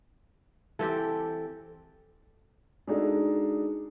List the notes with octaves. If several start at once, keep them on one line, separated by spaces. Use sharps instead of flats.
E3 C4 G4 A4
G#3 D4 D#4 F#4 A4